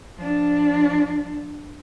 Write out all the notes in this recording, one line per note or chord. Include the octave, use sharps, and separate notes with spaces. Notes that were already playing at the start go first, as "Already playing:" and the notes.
F3 D4